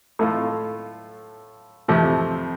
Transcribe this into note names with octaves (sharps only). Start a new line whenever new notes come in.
A2 A3 F4
F2 C3 F3 A3